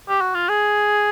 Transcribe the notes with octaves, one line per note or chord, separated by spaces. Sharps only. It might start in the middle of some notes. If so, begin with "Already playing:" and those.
G4
F#4
F4
G#4